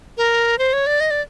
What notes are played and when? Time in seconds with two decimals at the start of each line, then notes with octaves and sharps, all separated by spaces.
0.17 A#4
0.59 C5
0.73 C#5
0.87 D5
1.00 D#5
1.11 D5